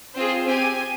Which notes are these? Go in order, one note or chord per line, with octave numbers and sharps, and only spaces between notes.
C4 F4 G#4 C5
C4 G4 G#5